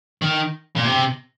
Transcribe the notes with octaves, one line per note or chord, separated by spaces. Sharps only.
D#3
A#2
C3